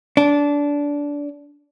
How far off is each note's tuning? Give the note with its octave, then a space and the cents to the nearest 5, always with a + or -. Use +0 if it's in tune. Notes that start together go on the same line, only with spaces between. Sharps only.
D4 -20